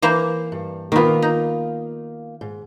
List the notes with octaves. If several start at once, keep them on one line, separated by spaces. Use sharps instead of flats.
E3 A#3 C5
G2
D#3 A#3 B3 F4
D#4
G#2